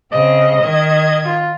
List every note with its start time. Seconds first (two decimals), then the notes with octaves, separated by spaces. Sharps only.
0.12 C#3 C4 D#5
0.61 D#3 G#6
1.26 F4